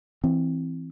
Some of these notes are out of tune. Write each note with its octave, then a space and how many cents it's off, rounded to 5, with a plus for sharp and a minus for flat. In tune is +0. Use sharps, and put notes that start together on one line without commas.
E3 +0 C4 +0